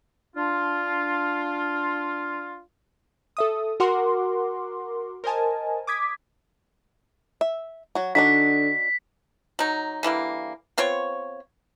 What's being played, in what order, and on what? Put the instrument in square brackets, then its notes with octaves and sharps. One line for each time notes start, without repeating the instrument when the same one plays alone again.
[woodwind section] D4 F4
[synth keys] A4 E5 D#6
F#4 A#4 F#5 C6 D6
A#4 C5 D#5 G#5 A5
D6 D#6 G#6 B6
[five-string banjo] E5
F#3 F#4
[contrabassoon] D3 [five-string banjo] D4 D#4 F#4 [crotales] B6
[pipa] F#3 D#4
D3 E3 G3 A#3
B3 C4 F4 C#5